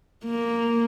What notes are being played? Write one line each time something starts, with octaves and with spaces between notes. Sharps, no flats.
A#3